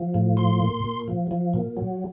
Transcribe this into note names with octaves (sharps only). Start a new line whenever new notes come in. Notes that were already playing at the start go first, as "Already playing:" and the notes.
Already playing: F3
A2
F3 C6
A#2
A#2
F3
F3
A#2
F#3